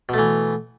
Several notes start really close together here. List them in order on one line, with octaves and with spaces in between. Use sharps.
B2 A3 E3